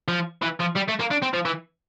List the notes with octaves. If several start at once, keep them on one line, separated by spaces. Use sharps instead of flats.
F3
E3
F3
G3
A3
A#3
D4
C4
F3
E3